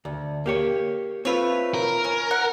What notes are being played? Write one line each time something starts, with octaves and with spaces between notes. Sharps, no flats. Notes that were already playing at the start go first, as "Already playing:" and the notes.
D2
A#3 G4 C#5
A3 C4 F4 B4 C#5
A#4
C#4
F#5